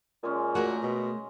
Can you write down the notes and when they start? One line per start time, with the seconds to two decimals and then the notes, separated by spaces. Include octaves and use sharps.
0.23 A#2 G#3 C#4
0.55 A3 F#4 G#4 A#4
0.83 B2